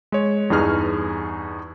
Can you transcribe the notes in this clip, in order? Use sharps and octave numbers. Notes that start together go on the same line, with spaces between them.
G#3 C#5
E2 G2 D#4 G#4 F6